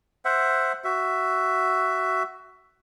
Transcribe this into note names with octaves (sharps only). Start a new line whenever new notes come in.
C5 E5 F#5
F#4 E5